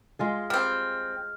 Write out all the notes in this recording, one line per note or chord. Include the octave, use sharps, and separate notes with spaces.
G#3 F4 G#4
G3 C4 F6